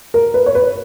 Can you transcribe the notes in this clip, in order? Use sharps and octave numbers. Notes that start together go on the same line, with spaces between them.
A#4
B4
C#5
B4